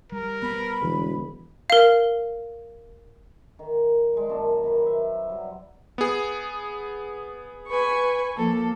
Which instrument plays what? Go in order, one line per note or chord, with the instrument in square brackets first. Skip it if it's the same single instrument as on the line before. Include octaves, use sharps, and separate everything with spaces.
[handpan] G3 [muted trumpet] A#4
[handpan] B3 [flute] B5
[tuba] E1 [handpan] D3 E3
[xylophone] A#4 F5
[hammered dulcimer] D#3
G3 G#3
F#2 A#2 A5
D#3 B4 C5
E5
F#3 G3
[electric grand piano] B3 G#4
[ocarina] B4 [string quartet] G#5 B5 C#6
[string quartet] F3 A4 [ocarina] A#3